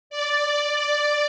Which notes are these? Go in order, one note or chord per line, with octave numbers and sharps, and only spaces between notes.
D5